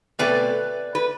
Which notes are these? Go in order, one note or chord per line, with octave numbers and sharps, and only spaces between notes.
B2 A3 C4 B4 D5
B4